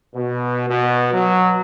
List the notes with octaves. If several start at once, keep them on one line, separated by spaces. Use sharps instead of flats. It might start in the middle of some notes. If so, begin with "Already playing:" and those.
B2
B2
F#3